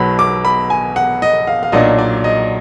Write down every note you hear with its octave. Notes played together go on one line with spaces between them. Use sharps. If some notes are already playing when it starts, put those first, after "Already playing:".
Already playing: B1 B2 F#3 B5
D6
B5
G#5
F#5
D#5
F5
F5
B1 A#2 F#3 D4 D#5
D5
D#5